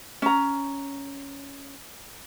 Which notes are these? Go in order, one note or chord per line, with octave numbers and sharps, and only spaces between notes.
C#4 A#5